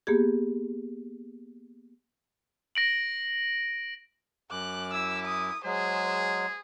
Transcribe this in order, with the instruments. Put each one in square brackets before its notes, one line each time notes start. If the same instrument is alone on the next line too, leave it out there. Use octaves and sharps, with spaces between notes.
[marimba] A#3 B3 G4 G#4
[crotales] A#6 D7 F#7
[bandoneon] F#2 D6 [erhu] F#6
[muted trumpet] E4 [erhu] E6
[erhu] D#6
[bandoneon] F#3 G#3 [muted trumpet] G#4 [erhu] C5